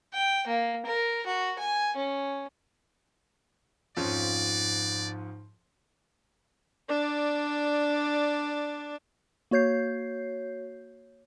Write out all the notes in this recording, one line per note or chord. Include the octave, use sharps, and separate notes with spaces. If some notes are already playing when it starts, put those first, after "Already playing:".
G5
A#3
A#4
F#4
G#5
C#4
F2 G#2 F3 C#4 D5
D4 D5
A#3 F#4 C#5 G6 C7